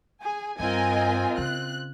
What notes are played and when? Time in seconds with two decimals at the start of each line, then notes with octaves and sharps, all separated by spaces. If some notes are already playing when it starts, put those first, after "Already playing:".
0.22 G#4 G#5
0.59 G2 C4 F4 A#4 D#5 G#5
1.38 C#3 F#6